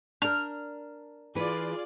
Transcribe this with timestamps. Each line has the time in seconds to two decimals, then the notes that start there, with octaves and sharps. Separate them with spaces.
0.22 D4 A#4 F6
1.35 E3 F4 G#4 B4 D5